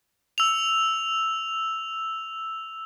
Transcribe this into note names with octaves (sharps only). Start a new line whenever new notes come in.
E6 F7